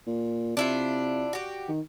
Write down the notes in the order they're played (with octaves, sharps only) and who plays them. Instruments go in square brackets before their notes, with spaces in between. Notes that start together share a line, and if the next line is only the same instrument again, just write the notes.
[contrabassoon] A#2
[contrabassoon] C3 [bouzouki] D4 E4 F4
[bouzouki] F#4 G4
[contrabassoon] D#3